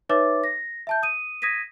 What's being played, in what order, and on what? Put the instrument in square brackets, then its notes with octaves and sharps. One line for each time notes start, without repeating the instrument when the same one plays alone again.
[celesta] D#4 B4 C#5 E5 D6 A6
A#6
E5 A5 G6
D#6 D#7
D#6 G#6 A#6 B6 D#7